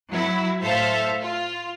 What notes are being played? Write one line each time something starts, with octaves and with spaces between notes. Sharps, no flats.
F#3 E4
A2 A4 C5 E5 F5
F4